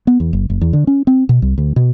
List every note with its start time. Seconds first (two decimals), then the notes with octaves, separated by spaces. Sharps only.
0.07 B3
0.20 E2
0.33 F#1
0.50 F#1
0.61 E2
0.73 D3
0.87 C#4
1.07 C4
1.29 B2
1.42 C2
1.58 D2
1.76 B2